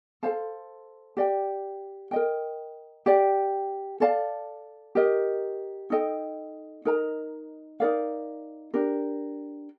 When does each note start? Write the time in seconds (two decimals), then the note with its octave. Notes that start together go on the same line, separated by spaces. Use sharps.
0.23 A4 C5 F5 A5
1.17 G4 D5 G5
2.11 A#4 D#5 G5
3.06 G4 D5 G5
4.00 A4 D5 F5 A5
4.95 G4 A#4 D#5
5.90 D#4 A4 D#5 G5
6.85 D#4 A#4 D#5 A#5
7.80 D#4 A#4 D5 F5
8.74 D4 G4 A#4